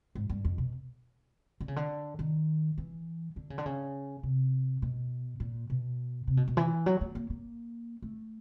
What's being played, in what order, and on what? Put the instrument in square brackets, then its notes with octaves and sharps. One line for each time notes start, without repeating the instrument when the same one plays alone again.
[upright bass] G#2
G2
F2
B2
D3
C#3
D3
D#3
E3
D3
C#3
D3
C#3
C3
B2
A#2
B2
C3
B2
B2
E3
F#3
A3
A#3
A#3
A3